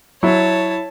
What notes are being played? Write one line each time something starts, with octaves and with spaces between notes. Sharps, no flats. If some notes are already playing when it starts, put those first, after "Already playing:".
F#3 E4 C#5 A5